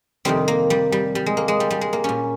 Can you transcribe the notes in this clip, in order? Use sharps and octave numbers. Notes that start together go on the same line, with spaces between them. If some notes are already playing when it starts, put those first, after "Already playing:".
F2 C3 D#3 G3 C4
A#3
G3
G3
G3
G#3
A#3
G#3
G3
G3
G#3
A#3
A#2 G3 C#4